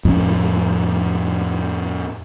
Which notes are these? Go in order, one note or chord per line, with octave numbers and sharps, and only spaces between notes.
F2 A2 C#4